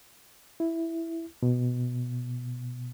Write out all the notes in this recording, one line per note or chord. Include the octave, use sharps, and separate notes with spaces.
E4
B2